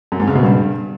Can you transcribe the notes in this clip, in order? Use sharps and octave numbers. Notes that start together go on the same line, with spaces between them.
F#2
G#2
C#3
B2
G2